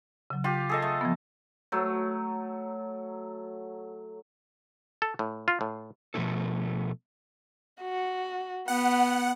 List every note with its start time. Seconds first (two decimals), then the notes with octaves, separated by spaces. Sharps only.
0.30 C#3 F#3
0.44 F4 G4 G5
0.69 G#4 A4 D#5
0.82 A3 C#6
1.01 F3 B3
1.72 F#3 A3
5.02 A4
5.19 A2
5.48 F4
5.61 A2
6.14 B2 F3 G#3 A3 E4 A4
7.82 F#4
8.68 B3 F#5